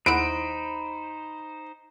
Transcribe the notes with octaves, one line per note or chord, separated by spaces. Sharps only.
D#2 D#4 E4 C5 F#5 B5 D7